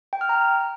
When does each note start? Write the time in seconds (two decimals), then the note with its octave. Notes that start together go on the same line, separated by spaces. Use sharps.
0.13 G5
0.21 F6
0.29 A#5